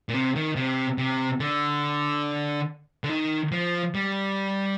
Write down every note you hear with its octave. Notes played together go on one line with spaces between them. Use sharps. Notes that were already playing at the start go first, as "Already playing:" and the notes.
A#2
C3
D#3
C3
C3
D3
D3
D#3
F3
G3